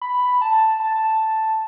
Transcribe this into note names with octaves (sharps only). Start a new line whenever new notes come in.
B5
A5
A5